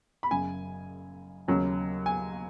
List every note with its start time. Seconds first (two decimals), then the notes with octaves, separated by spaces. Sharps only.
0.23 B5
0.31 F#1 F#2 C#3 G#5
1.48 D#2 C#3 F#3 C#4
2.06 G#5